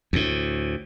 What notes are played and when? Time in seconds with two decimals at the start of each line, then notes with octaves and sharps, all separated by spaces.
0.13 D2 A2